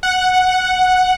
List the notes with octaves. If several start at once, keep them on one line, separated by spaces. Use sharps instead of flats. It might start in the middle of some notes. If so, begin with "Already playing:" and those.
F#5